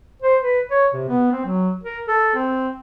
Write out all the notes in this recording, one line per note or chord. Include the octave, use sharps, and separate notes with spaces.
C5
B4
C#5
C3
B3
C4
F#3
A#4
A4
C4